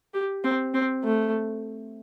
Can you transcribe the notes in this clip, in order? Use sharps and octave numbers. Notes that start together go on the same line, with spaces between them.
G4
C4
C4
A3